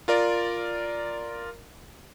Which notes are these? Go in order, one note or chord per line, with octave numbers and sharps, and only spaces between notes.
F4 A#4 D5